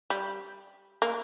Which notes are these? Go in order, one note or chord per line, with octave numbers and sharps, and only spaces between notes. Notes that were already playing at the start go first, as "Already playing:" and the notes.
G3
A#3